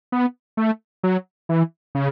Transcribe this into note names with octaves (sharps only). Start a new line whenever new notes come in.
B3
A3
F#3
E3
C#3